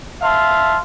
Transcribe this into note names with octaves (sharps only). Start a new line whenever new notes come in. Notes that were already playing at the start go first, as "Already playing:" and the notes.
E5 F5 A5 C6